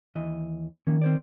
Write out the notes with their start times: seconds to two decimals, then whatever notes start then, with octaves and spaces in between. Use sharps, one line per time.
0.15 D#2 E3 D#5
0.87 D#3 F3 A#3 C#4
1.02 C4 C5 D5